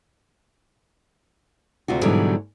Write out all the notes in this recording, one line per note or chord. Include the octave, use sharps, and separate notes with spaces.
D2 C3 F4 F#4
G#2 B2 D3 E3 F#3 G3